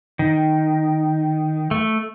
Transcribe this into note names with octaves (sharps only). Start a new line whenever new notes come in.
D#3
A3